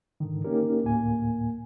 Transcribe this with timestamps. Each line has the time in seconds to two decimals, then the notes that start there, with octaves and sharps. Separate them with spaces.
0.20 G#2 D3 D#3
0.44 A#3 C#4 D#4 G4 A#4
0.84 D2 A2 A#3 G#5